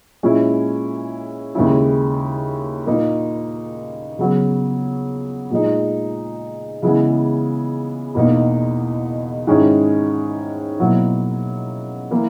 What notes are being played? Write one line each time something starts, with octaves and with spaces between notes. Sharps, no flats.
A#2 G#3 C#4 E4
D#2 C#3 G#3 C#4 E4
A#2 A#3 D#4
C#3 F#3 B3
A#2 G#3 D#4
C#3 E3 G#3 B3
E2 B2 A#3 D#4
G#2 D#3 G#3 C#4 E4
B2 F#3 A#3 E4
E3 A#3 E4